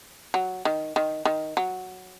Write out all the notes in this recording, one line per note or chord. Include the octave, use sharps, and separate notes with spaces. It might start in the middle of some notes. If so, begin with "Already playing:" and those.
F#3
D#3
D#3
D#3
F#3